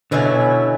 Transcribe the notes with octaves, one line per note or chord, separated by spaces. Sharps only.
B2 D3 F#3 C#4 E4